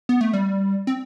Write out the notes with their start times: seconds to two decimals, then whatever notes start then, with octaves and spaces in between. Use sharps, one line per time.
0.09 B3
0.21 A3
0.33 G3
0.87 C4